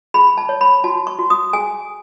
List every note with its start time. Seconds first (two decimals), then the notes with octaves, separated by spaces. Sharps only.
0.14 G#4 B5
0.38 A5
0.49 C#5
0.61 B5
0.84 F#4 A5
1.07 C#6
1.19 F#4
1.30 D#6
1.53 G#4 G#5